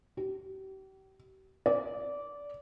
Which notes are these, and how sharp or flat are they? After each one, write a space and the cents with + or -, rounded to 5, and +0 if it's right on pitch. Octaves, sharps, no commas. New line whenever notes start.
G4 -40
D5 -15